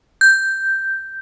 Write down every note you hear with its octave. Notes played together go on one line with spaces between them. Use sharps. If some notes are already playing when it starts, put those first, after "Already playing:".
G6